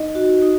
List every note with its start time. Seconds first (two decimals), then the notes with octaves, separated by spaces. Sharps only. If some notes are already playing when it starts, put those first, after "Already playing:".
Already playing: D#4 D#5
0.15 F#4
0.42 D#4